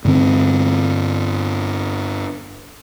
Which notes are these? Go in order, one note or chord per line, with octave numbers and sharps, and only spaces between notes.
G2 D3 C4